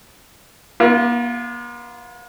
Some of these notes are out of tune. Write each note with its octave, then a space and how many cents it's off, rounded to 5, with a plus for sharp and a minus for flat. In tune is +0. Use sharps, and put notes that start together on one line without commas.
A#3 +45 F4 -20